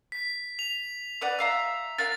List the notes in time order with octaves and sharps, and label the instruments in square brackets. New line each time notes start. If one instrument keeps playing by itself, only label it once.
[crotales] B6
F7
[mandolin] B4 D5 F#5
E5 F5 A#5
[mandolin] A#4 F5 F#5 [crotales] A6